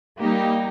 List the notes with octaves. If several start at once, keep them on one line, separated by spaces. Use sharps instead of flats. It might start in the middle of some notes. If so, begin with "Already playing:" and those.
G3 A#3 D#4 G4